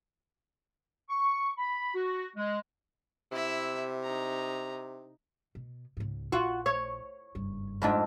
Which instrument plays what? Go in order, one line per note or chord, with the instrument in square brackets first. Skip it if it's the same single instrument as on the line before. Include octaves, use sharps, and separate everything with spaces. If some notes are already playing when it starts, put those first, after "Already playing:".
[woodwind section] C#6
B5
F#4
G#3
[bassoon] C3 [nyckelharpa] E4 E5
[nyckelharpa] D#4 A#5
[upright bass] B2
C#2 G#2
[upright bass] A#1 [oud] F4 F#4
[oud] C#5
[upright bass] F#1 G2
[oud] F2 G#2 D4